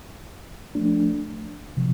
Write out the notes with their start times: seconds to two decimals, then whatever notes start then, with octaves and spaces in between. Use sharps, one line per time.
0.75 F3 A3 D4
1.77 C3 F3